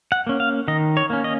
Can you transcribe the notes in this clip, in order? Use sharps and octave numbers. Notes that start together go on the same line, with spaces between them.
F#5
A#3 C#4
F5
D#3 D#5
C#5
A#3 C#4
D#5